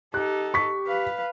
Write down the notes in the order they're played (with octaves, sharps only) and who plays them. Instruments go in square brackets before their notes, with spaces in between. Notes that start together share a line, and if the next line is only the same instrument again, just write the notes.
[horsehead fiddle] D#4 A4 [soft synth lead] G4 [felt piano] F#6
[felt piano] C#6 B6
[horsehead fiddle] B4 F5